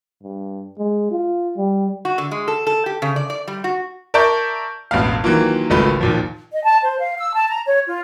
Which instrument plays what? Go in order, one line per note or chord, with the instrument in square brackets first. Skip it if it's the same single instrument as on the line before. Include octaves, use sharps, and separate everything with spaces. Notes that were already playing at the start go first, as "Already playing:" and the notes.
[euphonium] G2
G#3
F4
G3
[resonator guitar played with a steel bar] F#4
D3
G#3
A4
A4
G4
C#3
D5
D5
G3
F#4
[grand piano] A#4 D5 E5 A5 C#6 G6
E1 A1 B3 F5
D#3 E3 F#3 A#3 F4
G#1 C#2 A3 F4 B4
D#2 A#2 F3
[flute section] D#5
A5
C5
F5
E6
A5
A#5
C#5
F4